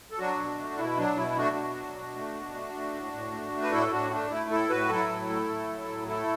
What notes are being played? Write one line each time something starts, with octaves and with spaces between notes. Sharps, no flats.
A4
F#3 D4 F#4
B2
A3
B2 E4
F#3 D4
B2 E4
A3 D4 F#4
B2
F#3
B2
A3
B2
A3
A3
A2
A2
A3
A3
B4
A2 E4 A4
E4
A2 D4 F#4
A3 D4
A3 E4
A2 E4 A4
A2 F#4 B4
F#3 E4 A4
A2
A3
A2
F#3
A2
A3 E4 A4